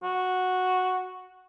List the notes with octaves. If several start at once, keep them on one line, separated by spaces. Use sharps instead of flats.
F#4